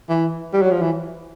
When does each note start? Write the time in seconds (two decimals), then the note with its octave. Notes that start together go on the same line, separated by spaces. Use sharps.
0.09 E3
0.53 G3
0.62 F#3
0.71 F3
0.81 E3